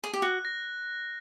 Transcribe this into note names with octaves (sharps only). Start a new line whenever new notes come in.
G#4
G4
F#4 F#6
A#6